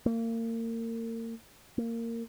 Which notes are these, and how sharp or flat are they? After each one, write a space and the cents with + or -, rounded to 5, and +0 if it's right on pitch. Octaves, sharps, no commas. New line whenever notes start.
A#3 -35
A#3 -20